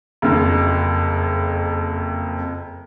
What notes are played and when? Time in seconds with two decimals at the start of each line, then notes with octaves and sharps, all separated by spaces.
0.22 F#1 F2